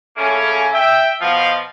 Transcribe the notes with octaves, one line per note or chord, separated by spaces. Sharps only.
C#3 A3 A#3 C#4
E5 G5
B2 F3 F5